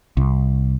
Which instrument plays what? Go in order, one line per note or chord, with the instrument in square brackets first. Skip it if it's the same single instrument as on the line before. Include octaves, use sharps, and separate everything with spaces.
[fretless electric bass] C2